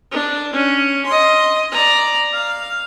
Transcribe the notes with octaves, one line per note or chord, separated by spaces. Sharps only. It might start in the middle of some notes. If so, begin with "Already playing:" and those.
D4
C#4
D#5 C6
D5 A#5
F5